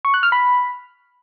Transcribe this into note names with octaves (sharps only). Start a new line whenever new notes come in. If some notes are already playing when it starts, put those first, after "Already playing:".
C#6
F#6
F6
B5